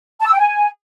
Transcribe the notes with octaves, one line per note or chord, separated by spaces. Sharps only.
A5
E6
G5
G#5